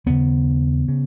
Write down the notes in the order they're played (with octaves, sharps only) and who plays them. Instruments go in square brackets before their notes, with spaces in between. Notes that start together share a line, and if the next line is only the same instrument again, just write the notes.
[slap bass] D#2 C#3 B3
C#3